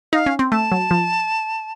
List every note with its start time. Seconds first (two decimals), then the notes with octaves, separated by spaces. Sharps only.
0.13 D#4 F5
0.26 C#4
0.39 C4
0.52 A3 A5
0.72 F#3
0.91 F3